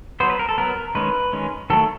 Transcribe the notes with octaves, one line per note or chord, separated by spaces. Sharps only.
F#3 B3 C5
B4
A#4
A4
F#3 B3 A#4
D#3 G#3 C#4 B4
D#3 G#3 C#4
D#3 F#3 A3 A4